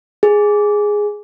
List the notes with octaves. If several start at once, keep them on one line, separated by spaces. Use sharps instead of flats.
G#4